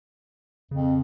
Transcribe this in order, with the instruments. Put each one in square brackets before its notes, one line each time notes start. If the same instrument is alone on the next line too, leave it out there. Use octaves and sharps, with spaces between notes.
[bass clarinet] F2 [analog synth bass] C#3